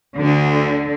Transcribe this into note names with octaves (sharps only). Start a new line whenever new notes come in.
D2 D3